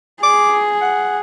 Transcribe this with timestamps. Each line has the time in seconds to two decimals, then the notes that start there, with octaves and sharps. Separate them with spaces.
0.23 G#4 D6
0.82 F#5